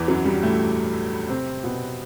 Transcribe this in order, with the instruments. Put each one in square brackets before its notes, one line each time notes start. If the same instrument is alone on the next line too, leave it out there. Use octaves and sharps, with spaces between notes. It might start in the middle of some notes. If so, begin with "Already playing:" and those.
Already playing: [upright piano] E2 E3
F#2 F#3
G2 G3
A2 A3
C3 C4
B2 B3